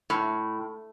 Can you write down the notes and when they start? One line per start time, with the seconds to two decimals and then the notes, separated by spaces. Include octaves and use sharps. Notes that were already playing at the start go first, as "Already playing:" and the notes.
0.10 A2